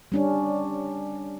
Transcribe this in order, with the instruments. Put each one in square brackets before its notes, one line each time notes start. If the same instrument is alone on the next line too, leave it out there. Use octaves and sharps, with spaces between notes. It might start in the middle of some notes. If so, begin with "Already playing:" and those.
[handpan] G3 C#4 D4